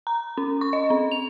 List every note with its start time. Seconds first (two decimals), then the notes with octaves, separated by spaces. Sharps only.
0.07 A#5
0.38 C#4
0.61 C#6
0.73 D#5
0.90 C4
1.11 F7